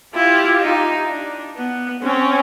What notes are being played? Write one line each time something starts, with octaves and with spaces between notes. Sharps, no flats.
E4 F4 G4
D#4
D4
B3
C4 C#4